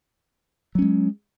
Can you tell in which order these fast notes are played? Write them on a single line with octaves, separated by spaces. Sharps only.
F#3 C#4 G#3